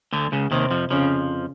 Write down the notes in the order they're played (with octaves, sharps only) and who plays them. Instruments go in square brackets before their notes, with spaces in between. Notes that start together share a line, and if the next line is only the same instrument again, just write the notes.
[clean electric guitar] D2 D3
C#2 C#3
[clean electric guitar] D#2 D#3 [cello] C3
[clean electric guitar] F2 F3
[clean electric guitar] F2 F3 [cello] C#3